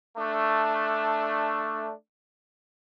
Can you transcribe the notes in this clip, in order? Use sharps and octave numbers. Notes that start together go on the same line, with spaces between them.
A3 D4